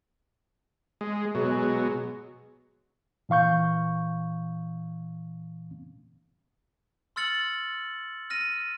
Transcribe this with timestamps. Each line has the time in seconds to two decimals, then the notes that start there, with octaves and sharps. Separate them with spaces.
1.01 G#3
1.35 B2 F#3 G#3
3.29 A#2 E3 F5 C#6 G6
7.16 C6 E6 F6 A6 C#7 F#7
8.30 F6 A#6 D#7